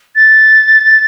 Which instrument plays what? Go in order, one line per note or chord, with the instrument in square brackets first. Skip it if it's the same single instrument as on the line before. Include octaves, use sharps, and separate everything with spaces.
[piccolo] A6